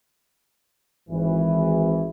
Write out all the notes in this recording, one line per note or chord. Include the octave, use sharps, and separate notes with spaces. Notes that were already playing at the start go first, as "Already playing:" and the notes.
G#1 E3